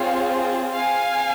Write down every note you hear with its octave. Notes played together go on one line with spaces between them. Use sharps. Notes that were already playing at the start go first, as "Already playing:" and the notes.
Already playing: C4 F4 G#4 C#5 F5
F5 G#5